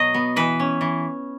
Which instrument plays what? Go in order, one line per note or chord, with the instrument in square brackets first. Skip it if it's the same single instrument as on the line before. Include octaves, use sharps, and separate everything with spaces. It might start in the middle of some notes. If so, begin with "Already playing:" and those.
Already playing: [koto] B2 F#3 D#5
B3
E3 B4
C#4
E3